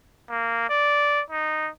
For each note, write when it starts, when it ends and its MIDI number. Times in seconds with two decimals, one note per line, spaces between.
0.30 0.68 58
0.69 1.21 74
1.30 1.69 63